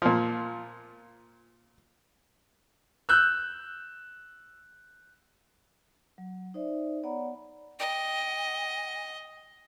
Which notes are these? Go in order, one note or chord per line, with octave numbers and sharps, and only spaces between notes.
A#2 F3
E6 F#6 G6
F#3
D#4 C5 D5 E5
B3 C#5 D5 F#5 A#5 B5
D#5 G5